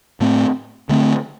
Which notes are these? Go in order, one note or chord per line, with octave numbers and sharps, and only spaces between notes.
A2 A3 C4
D3 A3 C4